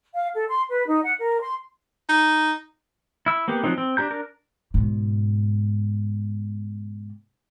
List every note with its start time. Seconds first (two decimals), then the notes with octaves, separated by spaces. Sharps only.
0.15 F5
0.34 A4
0.49 C6
0.70 B4
0.87 D#4
1.04 F#5
1.19 A#4
1.41 C6
2.09 D#4
3.26 E4 E6
3.48 A#3 B3 G4
3.63 F3 F#3 A#3 C4 D#4
3.78 C4
3.97 D4 G4 A#5 G6
4.10 D4 A#4
4.74 G#2 B2